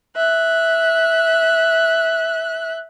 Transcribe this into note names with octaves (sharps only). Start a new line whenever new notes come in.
E5 F#6